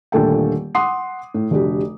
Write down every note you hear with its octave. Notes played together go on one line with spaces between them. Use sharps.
D#1 A#2 D3 A3 A4 G5
F#5 C6 D6 D#6 C7
A2
F1 D3 F#4 G4